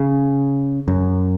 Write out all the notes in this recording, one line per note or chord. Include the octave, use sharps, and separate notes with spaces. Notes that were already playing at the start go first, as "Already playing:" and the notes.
Already playing: C#3
F#2